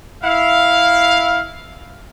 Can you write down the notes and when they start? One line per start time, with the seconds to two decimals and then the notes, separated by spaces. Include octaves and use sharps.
0.24 E4 F5